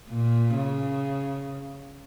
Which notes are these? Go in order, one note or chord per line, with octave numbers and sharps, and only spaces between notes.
A#2
C#3